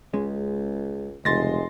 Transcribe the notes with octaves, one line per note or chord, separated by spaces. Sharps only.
C#2 G#3 C#4
F1 C#2 G#3 C6 A6 A#6